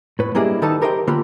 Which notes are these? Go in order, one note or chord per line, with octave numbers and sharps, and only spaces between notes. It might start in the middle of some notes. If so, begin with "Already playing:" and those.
A2 B4
G3 A#3 D4 E4 G#4 D#5
D#3 D#4 A4 B4 A5
G4 A#4 C5 D#5 E5 G5
D3 A#3 F4 G4 B5